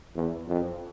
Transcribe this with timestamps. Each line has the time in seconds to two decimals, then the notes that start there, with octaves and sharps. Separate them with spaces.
0.15 E2
0.48 F2